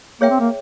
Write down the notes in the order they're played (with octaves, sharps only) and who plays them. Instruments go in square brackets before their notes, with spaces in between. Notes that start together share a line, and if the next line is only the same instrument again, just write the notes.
[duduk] A#3 [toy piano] G#4 C#5 E5 G5
[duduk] C4
A#3